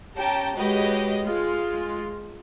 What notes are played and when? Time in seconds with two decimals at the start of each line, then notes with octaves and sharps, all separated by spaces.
0.16 C#4 G4 C#5 G5 A5 A#5
0.55 G#3 F#4 G4 B4 C#5 D#5
1.22 G#3 F4